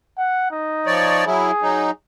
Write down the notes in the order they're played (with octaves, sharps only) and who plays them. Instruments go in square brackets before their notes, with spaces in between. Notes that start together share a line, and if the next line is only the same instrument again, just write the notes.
[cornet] F#5
D#4
[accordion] F3 C#5 D5
[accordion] F#3 E4 [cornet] G#4
[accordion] F#3 D#4